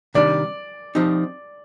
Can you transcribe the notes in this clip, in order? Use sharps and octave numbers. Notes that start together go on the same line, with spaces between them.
C3 D#3 G3 D4 D5
F3 C4 D#4 G4